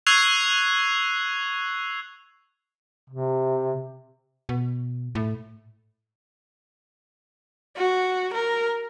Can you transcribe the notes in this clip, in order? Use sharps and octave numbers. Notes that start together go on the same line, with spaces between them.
C#6 E6 F#6 G#6 C7 F7
C3
B2
A2
F#4
A#4